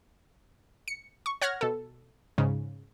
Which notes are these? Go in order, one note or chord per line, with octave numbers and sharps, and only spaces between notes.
C#7
C#6
C#5 F#5 F6 F#6 G#6 A#6
B2 A4
G#2 C#3